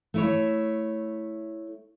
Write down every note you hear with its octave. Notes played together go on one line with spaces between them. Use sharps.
A3 E4 C#5